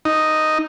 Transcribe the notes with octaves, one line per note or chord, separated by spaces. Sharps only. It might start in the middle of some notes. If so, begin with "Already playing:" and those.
D#4